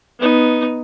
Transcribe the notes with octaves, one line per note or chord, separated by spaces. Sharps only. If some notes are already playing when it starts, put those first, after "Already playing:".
B3 D#4